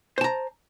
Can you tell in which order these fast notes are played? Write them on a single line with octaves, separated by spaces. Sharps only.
C5 A5 A#5